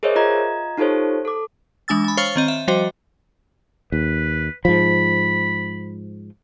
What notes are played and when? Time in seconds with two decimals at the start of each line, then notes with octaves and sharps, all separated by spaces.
0.03 G#4 A#4 C5 C#5 D#5 E5
0.16 F4 D#5 A#5 G#6
0.78 D#4 F4 G4 A4 C5 C#5
1.25 A4 D6
1.88 E3 G#3 D4 G#5 E6 A6
2.04 G#5 B5
2.17 C5 C#5 F5 C#6 F6 A6
2.36 D#3 C4 D#5
2.48 E5
2.68 F3 G3 F#4 C5 D#5
3.92 D#2 B4
4.65 G#2 F3 B5